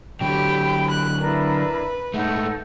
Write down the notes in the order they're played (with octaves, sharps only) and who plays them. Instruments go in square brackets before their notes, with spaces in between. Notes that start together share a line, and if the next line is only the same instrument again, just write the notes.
[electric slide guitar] D3 F#3 [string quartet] G4 G5 [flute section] B5
[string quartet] F#6
[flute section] D4 E4 A#4 [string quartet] B4
[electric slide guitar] A2 G#3 A3 [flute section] D#4 A4 F#5